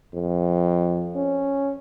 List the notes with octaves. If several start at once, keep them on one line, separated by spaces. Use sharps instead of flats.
F2
C#4